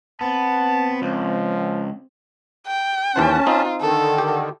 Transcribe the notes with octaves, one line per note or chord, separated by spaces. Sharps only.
B3 C4 A5
C#2 F3
G5
D#2 E3 C#4 C5 A5
C4 D#4 F4
D3 D#3 A4
G4